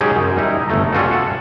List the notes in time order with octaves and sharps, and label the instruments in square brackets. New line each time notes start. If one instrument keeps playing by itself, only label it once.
[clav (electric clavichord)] F#3 G#3 C#4 D#4 G4 G#4
F#2
G3 D#4 E4
G1 A3 A#5
G3 C#4 F4 F#4 A4
A4 F#5